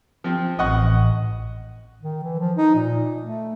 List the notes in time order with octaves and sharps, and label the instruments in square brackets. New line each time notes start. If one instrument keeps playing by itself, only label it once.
[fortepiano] F3 C4
[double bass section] A1 [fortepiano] D#5 F#5 C#6
[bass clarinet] D#3
E3
F3
D#4
A#2
A3